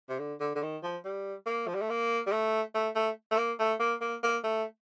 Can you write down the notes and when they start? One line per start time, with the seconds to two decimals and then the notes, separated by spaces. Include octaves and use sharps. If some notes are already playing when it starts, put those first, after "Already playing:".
0.09 C3
0.19 D3
0.40 D3
0.55 D3
0.62 D#3
0.83 F3
1.05 G3
1.46 A#3
1.67 F3
1.75 G3
1.81 A3
1.90 A#3
2.27 G3
2.32 A3
2.75 A3
2.95 A3
3.31 A3
3.37 A#3
3.59 A3
3.80 A#3
4.01 A#3
4.23 A#3
4.44 A3